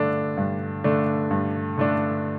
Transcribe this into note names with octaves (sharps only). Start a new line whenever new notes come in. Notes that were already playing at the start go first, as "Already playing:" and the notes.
Already playing: G2 D3 A3 D4
G2
D3 A3 D4
G2
D3 A3 D4